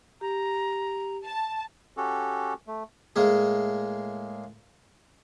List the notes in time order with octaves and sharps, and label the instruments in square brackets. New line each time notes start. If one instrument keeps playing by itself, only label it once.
[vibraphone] G4 [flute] A#5
[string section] A5
[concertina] C#4 F#4 G4 A4
A3
[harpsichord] A2 G#3 A#3 G#4